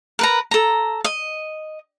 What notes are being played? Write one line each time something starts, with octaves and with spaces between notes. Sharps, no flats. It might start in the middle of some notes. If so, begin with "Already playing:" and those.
A#4 B4 A#5
A4 A#5
D#5